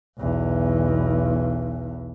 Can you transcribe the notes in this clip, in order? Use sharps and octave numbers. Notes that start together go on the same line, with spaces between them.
B1 E2